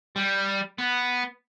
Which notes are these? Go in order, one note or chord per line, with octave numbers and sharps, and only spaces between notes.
G3
B3